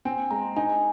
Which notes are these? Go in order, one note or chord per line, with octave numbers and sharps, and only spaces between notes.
C4 G#5
G#3 A#5
D#4 G#5
G#5